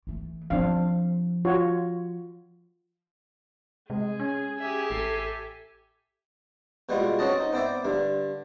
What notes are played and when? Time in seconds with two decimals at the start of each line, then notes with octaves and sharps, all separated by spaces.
0.07 E3 A3
0.50 F3 C4 D4 F5
1.45 F4 F#4 C#5
3.90 C3 G#3 G#4
4.20 C#4 G#5
4.58 G4 G#4 E5
4.90 A1 A4 G#5 C7
6.89 B2 G3 G#3 B3 F4
7.19 C4 C#4 F#4 D#5 A5
7.40 D#4
7.53 B3 C4 C5 D5 E5
7.85 G2 D3